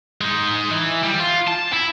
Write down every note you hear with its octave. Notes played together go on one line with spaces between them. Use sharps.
G#3 D#4
E3
G3
F4
A5
E4